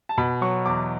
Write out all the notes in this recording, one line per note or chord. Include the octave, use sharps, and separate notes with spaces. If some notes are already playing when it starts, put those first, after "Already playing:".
A5
B2 B5
F#3 C#6
E2 D6